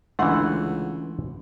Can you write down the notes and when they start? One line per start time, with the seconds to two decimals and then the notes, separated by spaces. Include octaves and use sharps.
0.19 C#2 D3 E3 A3 F#5 C6